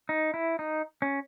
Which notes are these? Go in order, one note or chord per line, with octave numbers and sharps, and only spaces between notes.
D#4
E4
D#4
C#4